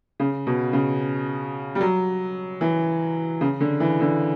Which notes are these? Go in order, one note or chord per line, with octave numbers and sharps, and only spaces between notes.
C#3
B2
C#3
G3
F#3
E3
C#3
D3
E3
D3